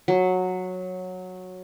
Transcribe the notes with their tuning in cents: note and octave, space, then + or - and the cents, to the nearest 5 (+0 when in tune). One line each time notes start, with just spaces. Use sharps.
F#3 -10